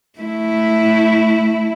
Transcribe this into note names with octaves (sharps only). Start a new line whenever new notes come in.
A3 E4